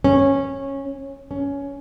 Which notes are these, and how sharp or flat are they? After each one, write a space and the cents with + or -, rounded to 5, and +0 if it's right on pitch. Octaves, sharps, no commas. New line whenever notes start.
C#4 -15
C#4 +15